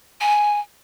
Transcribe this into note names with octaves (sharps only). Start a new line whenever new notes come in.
G#5